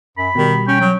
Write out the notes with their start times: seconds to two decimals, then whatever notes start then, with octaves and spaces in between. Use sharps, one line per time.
0.18 F#2 B5
0.35 B2 D#3 G3
0.68 C#4 G5
0.81 F#3